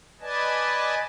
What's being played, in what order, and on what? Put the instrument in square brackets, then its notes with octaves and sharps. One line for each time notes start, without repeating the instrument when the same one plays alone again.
[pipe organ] B4 D5 D#5 G#5 A5